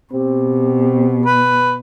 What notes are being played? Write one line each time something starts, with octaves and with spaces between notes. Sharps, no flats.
B2 C4 G4
B4